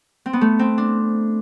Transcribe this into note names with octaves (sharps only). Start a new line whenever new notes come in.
C4
B3
A3
C4
D4